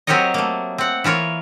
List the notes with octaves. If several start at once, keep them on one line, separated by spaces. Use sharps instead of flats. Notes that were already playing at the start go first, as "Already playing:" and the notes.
F#3 C4 G4 A#4 C#5 D#5
A3 A#3
C4 F#5
E3 F4 A#4 C#5